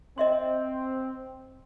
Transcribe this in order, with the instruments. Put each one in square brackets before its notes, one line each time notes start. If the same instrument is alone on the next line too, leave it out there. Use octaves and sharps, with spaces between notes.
[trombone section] C4 [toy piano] D#5 E5 C6